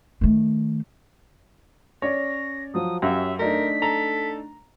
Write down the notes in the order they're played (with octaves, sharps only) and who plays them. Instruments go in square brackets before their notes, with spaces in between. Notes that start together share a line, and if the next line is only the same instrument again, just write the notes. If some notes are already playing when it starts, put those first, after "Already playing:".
[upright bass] D#3 A3
[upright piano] C#4 D5 [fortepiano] C#5 [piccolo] A#6
[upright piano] F3 F#3 [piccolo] D#6
[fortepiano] F#2 [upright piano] C#4 G4 F5 [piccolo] E5
[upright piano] A3 D4 D#4 [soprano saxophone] A#4 [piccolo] B6
[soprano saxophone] A4 [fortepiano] A#5